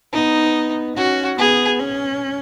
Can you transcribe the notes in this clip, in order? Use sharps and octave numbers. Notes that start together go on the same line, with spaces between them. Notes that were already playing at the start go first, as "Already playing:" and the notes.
B3 D#4
C#4 F#4
B3 G#4
C#4